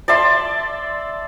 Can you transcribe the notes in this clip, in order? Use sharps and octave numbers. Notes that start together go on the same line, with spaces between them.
D5 E5 A5 C6